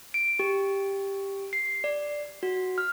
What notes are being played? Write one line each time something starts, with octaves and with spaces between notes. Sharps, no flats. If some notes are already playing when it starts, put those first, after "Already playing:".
D7
G4
C7
D5
F#4
F6